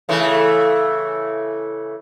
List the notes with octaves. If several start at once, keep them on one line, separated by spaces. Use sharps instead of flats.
C#3 E3 A3